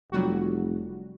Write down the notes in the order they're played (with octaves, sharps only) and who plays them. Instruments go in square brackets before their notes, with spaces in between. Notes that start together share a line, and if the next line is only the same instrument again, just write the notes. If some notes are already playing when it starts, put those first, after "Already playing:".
[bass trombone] F1 [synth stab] F#3 G3 F#4